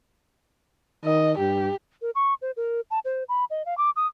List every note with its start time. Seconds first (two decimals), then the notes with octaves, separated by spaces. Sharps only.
1.05 D#3 D#5
1.38 G2 G4
2.02 A#4
2.15 C#6
2.42 C5
2.57 A#4
2.91 A5
3.05 C5
3.29 B5
3.50 D#5
3.66 F5
3.77 D6
3.96 D#6